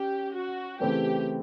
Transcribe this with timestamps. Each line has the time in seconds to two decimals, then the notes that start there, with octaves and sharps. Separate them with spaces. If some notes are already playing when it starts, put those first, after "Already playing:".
Already playing: C#4 G4
0.34 F#4
0.79 C#3 E3 A3 C4 E4 G4